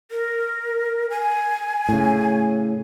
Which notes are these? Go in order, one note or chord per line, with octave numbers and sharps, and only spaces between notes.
A#4
G#5
A2 C#3